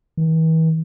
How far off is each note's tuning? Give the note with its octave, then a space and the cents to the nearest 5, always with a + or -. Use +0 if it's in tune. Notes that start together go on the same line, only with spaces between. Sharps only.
E3 -40